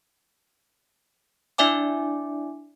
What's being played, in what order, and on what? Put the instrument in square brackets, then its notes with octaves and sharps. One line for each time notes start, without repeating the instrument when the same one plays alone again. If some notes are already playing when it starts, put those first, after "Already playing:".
[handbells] D4 E4 D5 E5 G#5 D6